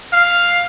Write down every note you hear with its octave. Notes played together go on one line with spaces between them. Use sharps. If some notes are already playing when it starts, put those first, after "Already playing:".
F5